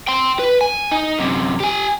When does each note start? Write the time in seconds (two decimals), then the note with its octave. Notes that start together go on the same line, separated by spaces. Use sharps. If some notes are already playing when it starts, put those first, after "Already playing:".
0.08 G5 C6
0.39 B4
0.61 G#5
0.92 D#4
1.19 F#2 C3
1.60 G4 G#5